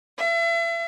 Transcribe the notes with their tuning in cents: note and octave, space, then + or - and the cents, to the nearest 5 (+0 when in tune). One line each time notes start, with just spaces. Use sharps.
E5 +35